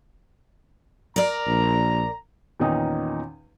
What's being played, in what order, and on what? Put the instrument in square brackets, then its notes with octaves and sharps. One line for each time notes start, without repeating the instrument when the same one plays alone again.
[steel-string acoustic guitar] A#4 D5 [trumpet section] A#5
[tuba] A#1
[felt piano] E2 A#2 D#3 C#4 D#4 D#6